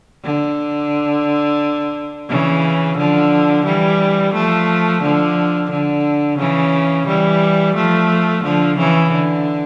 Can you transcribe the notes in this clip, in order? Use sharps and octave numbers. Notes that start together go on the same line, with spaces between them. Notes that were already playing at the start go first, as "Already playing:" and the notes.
D3
C#3 E3
D3 F3
E3 G3
F3 A3
D3 F3
D3
C#3 E3
E3 G3
F3 A3
D3 F3
C#3 E3
D3